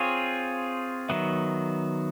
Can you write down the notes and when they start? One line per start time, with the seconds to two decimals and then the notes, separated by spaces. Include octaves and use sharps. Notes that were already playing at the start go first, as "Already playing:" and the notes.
Already playing: C4 F4 G#4 C#5 F5
1.09 D#3 F#3 B3 E5